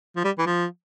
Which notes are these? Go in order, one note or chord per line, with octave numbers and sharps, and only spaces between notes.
F3
G3
E3
F3